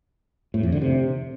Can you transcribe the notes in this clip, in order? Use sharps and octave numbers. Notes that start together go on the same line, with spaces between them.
A2
F2
D3
C3